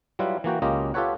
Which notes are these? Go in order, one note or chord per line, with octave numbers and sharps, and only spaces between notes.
F#3 G3 E4 F4 B4
E3 A#3 F#4 G5
C#2 A#3 C#4 F4 G4 D#5
F4 G4 A4 B4 C#5 F#5